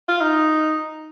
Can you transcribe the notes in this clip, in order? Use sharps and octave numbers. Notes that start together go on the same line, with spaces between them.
F4
D#4